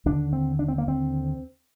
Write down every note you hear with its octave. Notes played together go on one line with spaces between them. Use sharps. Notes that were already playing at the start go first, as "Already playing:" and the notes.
D#2 D3 D4
C4
D4
C4
A#3
C4